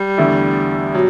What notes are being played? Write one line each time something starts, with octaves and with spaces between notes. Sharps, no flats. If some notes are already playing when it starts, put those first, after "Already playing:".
Already playing: G3
E2 D3 A3 E4
B2 F#3